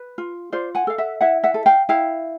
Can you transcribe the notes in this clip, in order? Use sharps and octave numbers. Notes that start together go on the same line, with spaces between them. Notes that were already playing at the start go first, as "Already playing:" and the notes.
Already playing: B4
F4
F4 C5 D5
F#5 G#5
A4 F5
E5 F#5
E4 E5 F#5
E5 F#5
A4
F5 G5
E4 F5 G5